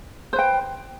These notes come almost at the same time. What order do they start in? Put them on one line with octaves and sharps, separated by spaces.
C5 B4 G5